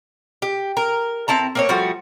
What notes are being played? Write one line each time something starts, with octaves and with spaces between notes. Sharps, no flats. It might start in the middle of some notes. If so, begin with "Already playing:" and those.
G4
A#4
C4 E4 A5 A#5
A#3 C4 C#5
F3 G3 A3 F#4